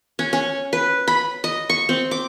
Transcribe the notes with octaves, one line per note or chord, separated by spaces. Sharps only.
C#4
C#4
B4
B5
D#5
C#6
C4
D6